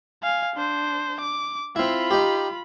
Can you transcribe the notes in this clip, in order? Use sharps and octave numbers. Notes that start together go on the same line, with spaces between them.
F5 G#5
D4 C5
D6
C4 E4 F4 B5
D#4 G4